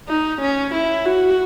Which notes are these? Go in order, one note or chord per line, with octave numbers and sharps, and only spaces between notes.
D#4
C#4
E4
F#4